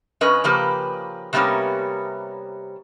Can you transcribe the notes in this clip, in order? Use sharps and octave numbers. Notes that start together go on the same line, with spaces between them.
F2 C#4 B4 D#5
C#3 F3 A#3 G4 B4
C3 G3 A#3 B3 C#4